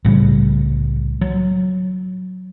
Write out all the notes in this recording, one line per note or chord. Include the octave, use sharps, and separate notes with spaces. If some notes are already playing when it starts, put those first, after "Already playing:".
C2 A2 C#3 G3
F#3